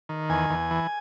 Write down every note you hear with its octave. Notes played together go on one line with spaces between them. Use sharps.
D#3
E2 G#5
E2
E3